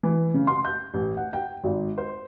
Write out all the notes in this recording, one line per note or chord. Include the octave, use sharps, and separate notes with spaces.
E3
C#3
C6
G6
A1
F#5
G5
G#1
C5